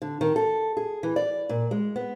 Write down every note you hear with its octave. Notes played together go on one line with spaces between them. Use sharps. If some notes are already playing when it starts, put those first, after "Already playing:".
D3
D#3
A4
G#4
E3
D5
A#2
G#3
B3